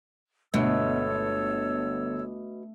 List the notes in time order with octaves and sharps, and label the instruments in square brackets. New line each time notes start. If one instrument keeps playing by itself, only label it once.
[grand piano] G1 [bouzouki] B2 [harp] A3 [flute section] A4 C#5 E6